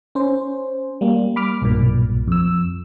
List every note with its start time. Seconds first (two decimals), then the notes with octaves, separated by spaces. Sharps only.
0.15 C#4 C5
1.01 G3 A#3
1.36 B5 D6 F6
1.62 B1 G2 A#2
2.28 F2 E6